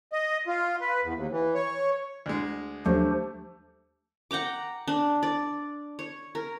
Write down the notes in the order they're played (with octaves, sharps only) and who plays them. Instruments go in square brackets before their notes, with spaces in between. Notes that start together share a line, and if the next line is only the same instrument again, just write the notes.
[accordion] D#5
F4
B4
E2
D#2
E3
C#5
[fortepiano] D2 G#3
[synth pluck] D#2 F3 F#3 [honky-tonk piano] A3 [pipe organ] D4 G4 C5
[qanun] F#5 G5 A#5 D6
D4
D5
C#5
A#4